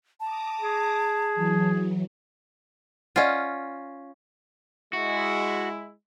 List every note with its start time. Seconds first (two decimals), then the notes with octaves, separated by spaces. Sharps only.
0.20 A5 A#5 D6 D#6
0.61 G#4
1.36 E3 F#3
3.16 C#4 F4 D5 D#5 F#5
4.93 G#3 E4 F#4